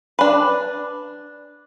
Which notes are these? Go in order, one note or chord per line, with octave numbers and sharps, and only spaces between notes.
D4 B4